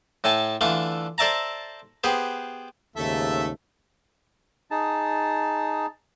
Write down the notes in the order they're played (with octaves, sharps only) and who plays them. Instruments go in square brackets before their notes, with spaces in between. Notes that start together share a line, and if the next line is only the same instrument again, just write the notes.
[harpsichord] A2 A3 G#5 A5
D3 E3 A3 D4 F4
A4 C5 D5 E5 A5 A#5
B3 G4 G#4 B4 C5
[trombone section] D#2 G#2 C#3 [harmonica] A3 A4 E5
[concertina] D#4 G#4 A5